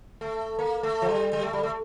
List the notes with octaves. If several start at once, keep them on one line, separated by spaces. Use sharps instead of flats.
A3
A#3
A3
F3
G3
G3
A3
G3
A3